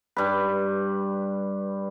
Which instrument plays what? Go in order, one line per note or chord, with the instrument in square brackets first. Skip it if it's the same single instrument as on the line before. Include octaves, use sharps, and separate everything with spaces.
[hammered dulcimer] G2 B4